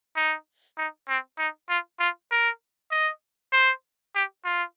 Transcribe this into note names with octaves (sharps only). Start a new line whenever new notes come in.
D#4
D#4
C4
D#4
F4
F4
A#4
D#5
C5
G4
F4